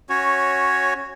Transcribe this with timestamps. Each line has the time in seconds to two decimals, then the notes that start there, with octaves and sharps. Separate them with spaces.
0.09 C#4 F#4 C#5